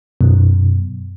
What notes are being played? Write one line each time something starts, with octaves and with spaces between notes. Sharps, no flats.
F#2 B2